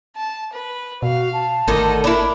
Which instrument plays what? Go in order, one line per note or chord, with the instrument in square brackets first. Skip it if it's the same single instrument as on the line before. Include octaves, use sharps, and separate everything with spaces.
[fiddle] A5
B4
[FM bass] B2 [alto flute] F#4 [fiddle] F5
[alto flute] A5
[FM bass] G#1 [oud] D2 D3 D#3 [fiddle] A4 D#5
[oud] D4 E4 [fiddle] A#4 [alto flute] B5